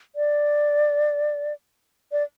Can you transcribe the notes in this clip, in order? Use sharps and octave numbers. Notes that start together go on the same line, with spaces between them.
D5
D5